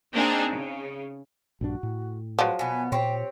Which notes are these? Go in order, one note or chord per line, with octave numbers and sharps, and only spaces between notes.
A#3 C4 D4 D#4 G#4
C#3
A#1 G2 D4 F#4
A2
F3 F#3 G#3 B4
B2 B3 G#5
A#2 C4 G4 C#5 G5